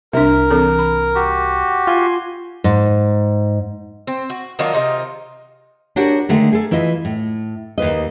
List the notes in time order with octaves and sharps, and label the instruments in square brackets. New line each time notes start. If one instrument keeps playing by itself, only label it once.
[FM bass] C2 [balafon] D4 E5 [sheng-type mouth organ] A#4
[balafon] E3 C4 A4
B5
[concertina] F#4 G4
[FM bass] F4 [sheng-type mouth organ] G#5 C6
[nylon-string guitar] G#2
[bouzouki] C4
F#4
D#3 F#3 D4 F4
C3 D#4 F4
[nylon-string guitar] D4 F#4 G4 A#4 C#5 F#5
D3 D#3 G#3 A3 F#5
G#4 A4
E3 E4 F4 D#5
A2
D#2 D#3 B4 D#5